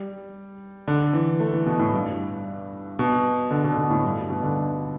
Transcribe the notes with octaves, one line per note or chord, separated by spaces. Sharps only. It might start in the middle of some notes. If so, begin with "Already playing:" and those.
Already playing: G3
D3
E3
A3
E3
B2
A2
G2
B2
D3
B2
D3
B2
A2
G2
B2
D3